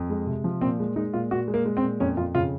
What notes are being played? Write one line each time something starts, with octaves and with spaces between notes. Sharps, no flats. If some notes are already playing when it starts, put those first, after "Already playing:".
Already playing: F2
G#3
C3
F3
A#2 C4
G#3
G#3 D#4
A#2 F4
A#2 F#4
G#3
A#3
G#3
C4
A#2
F2 C#4
F2 F4
C#3 F4